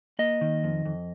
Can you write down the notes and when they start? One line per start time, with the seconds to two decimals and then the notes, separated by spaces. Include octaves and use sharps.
0.19 A#3 D#5
0.41 D#3
0.64 F2
0.86 F2